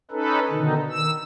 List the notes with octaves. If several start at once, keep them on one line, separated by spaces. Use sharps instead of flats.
C#4 D#4 A4 B4
B2 D3 D#3 D#4
D#3 E6